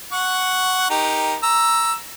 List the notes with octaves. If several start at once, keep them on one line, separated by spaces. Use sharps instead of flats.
F#5 C#6
D#4 G4 A#4
A#5 E6